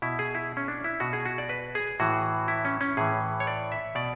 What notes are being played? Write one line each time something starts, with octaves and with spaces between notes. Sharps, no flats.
B2 E4
G#4
E4
C#4
D4
E4
B2 F#4
G#4
F#4
D5
B4
G#4
A2 E3 F#4
E4
C#4
C#4
A2 E3 G#4
C#5
D5
E5
B2 D5